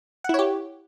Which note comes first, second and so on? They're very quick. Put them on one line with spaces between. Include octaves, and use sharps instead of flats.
F#5 E4 C#5 G4